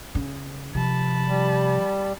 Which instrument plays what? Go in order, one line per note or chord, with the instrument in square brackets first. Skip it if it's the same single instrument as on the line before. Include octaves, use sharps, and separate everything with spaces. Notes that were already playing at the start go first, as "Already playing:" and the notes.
[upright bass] C#3
[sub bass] C3 [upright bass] F3 [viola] A5 B5
[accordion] G3